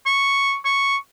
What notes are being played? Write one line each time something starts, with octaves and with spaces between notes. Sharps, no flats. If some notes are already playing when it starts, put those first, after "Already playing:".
C#6
C#6